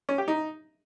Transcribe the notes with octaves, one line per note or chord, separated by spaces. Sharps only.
C#4
G4
D#4